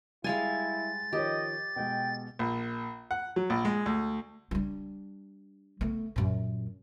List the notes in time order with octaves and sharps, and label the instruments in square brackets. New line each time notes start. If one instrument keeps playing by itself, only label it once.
[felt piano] G3 [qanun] G#3 F5 G#5 [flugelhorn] E4 [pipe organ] A6
[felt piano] D#3 F3 C#5 [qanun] G4 [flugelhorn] D#5
[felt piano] B2 G#3 [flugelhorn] G5
[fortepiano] A#1
F#5
F#3
A#1
G#3
D2
[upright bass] G3 D4
A3 B3
F#2 A#2